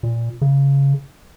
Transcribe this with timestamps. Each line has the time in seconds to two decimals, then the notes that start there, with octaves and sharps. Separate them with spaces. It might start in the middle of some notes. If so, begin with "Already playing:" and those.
0.03 A#2
0.41 C#3